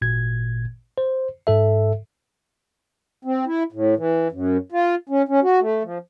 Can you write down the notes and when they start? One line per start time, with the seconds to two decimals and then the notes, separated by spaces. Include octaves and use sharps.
0.02 G#1 A#2 G#6
0.98 C5
1.47 G#2 A4 E5
3.25 C4
3.46 E4
3.72 A2
3.97 E3
4.32 F#2
4.72 F4
5.09 C#4
5.28 C#4
5.43 F#4
5.60 A3
5.83 F3